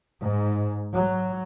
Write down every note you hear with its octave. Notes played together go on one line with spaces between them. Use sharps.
G#2
F#3